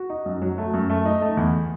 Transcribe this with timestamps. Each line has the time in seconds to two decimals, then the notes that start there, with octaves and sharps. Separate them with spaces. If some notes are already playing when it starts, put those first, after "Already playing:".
Already playing: F#4
0.10 D#4
0.26 F#2
0.42 F#3
0.58 A3
0.74 F#2
0.90 A3
1.05 D#4
1.21 A3
1.37 E2